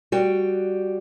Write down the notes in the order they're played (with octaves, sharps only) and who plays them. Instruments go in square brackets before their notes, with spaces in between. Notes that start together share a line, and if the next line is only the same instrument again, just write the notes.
[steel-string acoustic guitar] G3 F#4 G5